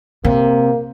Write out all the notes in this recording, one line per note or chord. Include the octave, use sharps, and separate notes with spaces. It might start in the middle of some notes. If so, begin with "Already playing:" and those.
C3 A#3